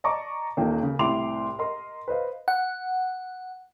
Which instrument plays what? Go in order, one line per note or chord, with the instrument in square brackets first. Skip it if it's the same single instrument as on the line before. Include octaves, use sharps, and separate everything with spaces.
[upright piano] D5 D#5 A5 A#5 C#6 D6
D#1 A#3 D#4 G4
C#3
C2 A2 E4 C6 D6 F7
A#4 D#5 C6
B4 C5 D#5 F5
[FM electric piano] F#5